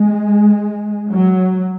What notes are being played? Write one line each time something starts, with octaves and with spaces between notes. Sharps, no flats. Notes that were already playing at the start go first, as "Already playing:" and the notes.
Already playing: G#3
F#3